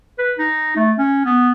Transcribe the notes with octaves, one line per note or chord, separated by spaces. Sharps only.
B4
D#4
A3
C#4
B3